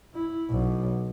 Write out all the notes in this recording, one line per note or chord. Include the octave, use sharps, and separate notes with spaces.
E4
B1